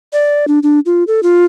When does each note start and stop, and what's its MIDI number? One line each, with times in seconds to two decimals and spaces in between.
0.13 0.45 74
0.48 0.59 62
0.63 0.80 62
0.86 1.04 65
1.07 1.20 69
1.23 1.45 65